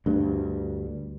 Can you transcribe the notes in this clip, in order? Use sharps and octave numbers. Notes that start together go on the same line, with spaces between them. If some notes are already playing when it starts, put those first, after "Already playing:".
D2 G2